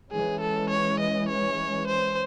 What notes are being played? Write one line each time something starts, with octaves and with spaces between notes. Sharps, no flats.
E3 G#3 C#4 G#4
A4
C#5
D#5
C#5
C5